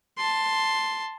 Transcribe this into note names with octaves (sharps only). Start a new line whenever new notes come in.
A5 C6